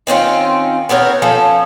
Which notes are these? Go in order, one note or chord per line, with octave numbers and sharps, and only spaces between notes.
D#3 C4 C#4 F4
B3 C4 A#4 C#5
F3 C#4 A4